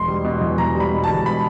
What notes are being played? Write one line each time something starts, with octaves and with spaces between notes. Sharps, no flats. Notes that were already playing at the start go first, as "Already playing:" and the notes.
Already playing: E1 C6
G3
B2
E2
E2 A#5
G3
B5
B2
A5
E1
B5